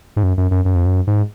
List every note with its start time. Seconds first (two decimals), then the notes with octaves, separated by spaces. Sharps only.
0.16 G#2
0.23 F#2
0.38 F#2
0.51 F#2
0.65 F#2
0.75 F2
0.86 F#2
1.07 G#2